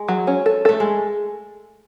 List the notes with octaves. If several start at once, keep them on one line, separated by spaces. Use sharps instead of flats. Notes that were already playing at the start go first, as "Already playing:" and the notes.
Already playing: G#3
F#3
C#4
A4
A3 A4
G#3